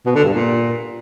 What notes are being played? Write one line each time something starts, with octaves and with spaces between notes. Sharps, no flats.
B2
D3
G2
A#2